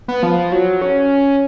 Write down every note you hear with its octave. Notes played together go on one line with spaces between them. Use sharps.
B3
F3
F#3
C#4